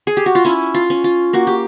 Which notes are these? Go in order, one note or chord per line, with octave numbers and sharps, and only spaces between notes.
G#4
G4
F#4
F4
C#4 E4
F4
C#4
F4
A#3 F#4
G4